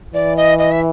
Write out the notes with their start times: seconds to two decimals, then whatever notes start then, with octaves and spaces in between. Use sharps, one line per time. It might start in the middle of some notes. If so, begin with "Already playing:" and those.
0.14 E3 D5
0.37 D#5
0.58 D#5
0.71 E5